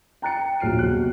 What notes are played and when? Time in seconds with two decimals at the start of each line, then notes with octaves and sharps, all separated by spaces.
0.22 G5 A#5 F#6 A6 C#7
0.60 D#1 A#1 F#3 F6 C7 D7
0.79 B2 F#6